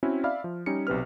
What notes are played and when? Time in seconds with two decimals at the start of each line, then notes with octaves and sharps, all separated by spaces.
0.03 C4 C#4 E4 F#4
0.24 D5 E5 F5 B5 F6
0.44 F3
0.66 G3 C#4 D#4 C#7
0.87 B1 C3 B4 F6